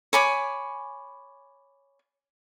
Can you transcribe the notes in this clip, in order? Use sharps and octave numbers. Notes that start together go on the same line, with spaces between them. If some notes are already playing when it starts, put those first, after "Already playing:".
C#5 G#5 B5 D6